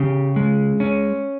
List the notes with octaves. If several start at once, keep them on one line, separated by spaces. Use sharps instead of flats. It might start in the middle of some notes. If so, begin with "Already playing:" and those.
Already playing: C#3 G4
G#3
C#4